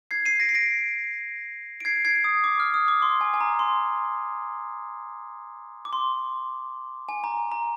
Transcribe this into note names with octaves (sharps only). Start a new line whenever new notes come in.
G#6 C7
C7 D#7
A#6 D7
C7
A#6 D7
D7
G#6 C7
G#6 C7
D#6
D6
F6
D#6
D6
C6
G#5
G#5
A#5
C6
D6
C6
G#5
A#5
A#5